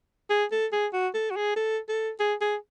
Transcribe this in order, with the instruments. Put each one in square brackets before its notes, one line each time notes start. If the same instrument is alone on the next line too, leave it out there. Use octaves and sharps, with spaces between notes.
[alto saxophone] G#4
A4
G#4
F#4
A4
F#4
G#4
A4
A4
G#4
G#4